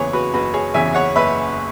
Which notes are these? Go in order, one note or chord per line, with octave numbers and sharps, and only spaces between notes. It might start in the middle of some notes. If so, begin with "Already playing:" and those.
Already playing: F#1 E2 C#3 E3 G#4 B4 C#5
F#4 B4
F#1 F#4 B4
G#4 C#5
E2 C#3 E3 E5 G#5
C#5 F#5
F#1 B4 E5